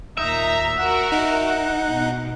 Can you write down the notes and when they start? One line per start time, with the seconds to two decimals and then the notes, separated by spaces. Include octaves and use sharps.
0.18 D#2 A#2 D#4 E5 A#5
0.78 F#4 A#4 F#5
1.12 D#4
1.91 B2